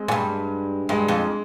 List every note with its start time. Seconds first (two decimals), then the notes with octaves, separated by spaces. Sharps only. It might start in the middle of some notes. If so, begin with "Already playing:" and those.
Already playing: G#3 C4
0.08 G#2
0.12 G2
0.89 G2 G#3
1.08 F2